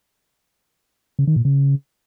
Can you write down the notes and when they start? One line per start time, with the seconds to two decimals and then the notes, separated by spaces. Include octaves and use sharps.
1.19 C#3
1.27 D#3
1.36 A#2
1.45 C#3